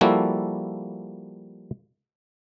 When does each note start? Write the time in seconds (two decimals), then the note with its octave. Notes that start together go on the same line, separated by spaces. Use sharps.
0.01 F3 G3 A#3 E4 F#4 A4